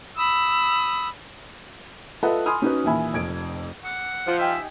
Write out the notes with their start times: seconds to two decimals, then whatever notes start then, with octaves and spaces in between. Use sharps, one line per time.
0.16 B5 D#6 E6
2.23 F4 A4 B4 D#5 E5 F#5
2.46 G#5 B5 C6 D#6 F6
2.62 C#4 D#4 F#4 B4 C#5
2.84 D#2 A#2 E3 E5 G#5 B5
3.13 F1 F2 G#6 D7
3.85 F#5 D6 E6
4.27 F3
4.39 D#4 G4 E5 G#5